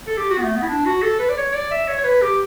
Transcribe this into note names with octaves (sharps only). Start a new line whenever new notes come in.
A4
G4
F#4
B3
A3
B3
E4
D4
F#4
A4
B4
D5
C#5
D5
E5
C#5
C#5
B4
G4